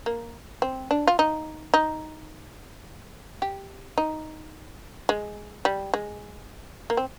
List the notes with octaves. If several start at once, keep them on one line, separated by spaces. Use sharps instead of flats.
A#3
C4
D4
F4
D#4
D#4
G4
D#4
G#3
G3
G#3
A#3
C4